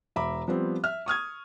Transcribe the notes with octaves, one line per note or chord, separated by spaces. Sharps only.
E1 E5 A#5 B5 D6
F3 G3 B3 C4
E5 F6
C#6 D#6 F6 G#6